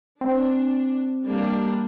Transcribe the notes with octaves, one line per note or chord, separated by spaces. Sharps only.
C4 D4
G3 A#3 D4